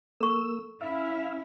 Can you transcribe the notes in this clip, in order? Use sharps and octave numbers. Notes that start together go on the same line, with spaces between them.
A#3 A4 C#6 E6
C#4 E4 E5 F5